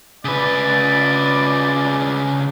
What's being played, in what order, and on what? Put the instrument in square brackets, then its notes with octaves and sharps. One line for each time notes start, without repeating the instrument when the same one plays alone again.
[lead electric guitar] C#3 B4 [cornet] D5